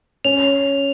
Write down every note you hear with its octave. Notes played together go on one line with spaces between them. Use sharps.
C#4 F7